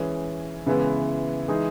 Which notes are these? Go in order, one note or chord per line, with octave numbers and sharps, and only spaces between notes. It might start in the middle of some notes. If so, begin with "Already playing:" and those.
Already playing: E3 G#3 C#4 G#4
C#3 E3 G#3 B3 E4
E3 G#3 D#4 G#4